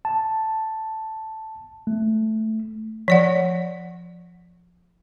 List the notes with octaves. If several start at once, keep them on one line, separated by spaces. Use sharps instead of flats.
A5
A3
F3 D5 F#5